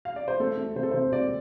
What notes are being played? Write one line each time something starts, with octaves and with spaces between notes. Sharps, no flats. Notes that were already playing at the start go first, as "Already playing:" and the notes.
F5
D5
C5
A3 A4
A3
C3 C5
A4
C3 C5
C3 D5